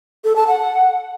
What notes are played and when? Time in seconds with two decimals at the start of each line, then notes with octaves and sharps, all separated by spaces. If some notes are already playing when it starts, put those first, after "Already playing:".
0.24 A4
0.36 A5
0.47 F#5